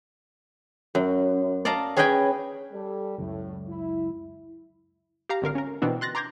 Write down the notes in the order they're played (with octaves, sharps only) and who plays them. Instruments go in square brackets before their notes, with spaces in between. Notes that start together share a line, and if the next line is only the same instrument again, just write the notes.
[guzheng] F#2
D5 D#5 F5 A5 A#5
C#4 G#4 B4 D#5 G5 G#5
[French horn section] G3 A4
[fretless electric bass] C#2 F#2 [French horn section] A2
[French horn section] E4
[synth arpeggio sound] G4 F5 A#5
G#1 D3 A#4 F5
C#4 A#4
B2 E3 B3 C4 D4
C6 F#6 A6 A#6
A#5 C6 D6 G6 G#6 A#6